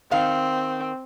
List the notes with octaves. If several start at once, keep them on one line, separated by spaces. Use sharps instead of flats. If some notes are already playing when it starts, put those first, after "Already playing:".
D#3 C4 F5